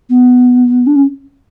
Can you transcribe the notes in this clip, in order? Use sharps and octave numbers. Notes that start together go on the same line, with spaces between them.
B3
D4
C#4